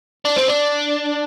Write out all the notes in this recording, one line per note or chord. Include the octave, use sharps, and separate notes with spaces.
D4
C4
D4